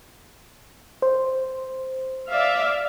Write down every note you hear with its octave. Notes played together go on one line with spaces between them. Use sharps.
C5
D5 E5 F5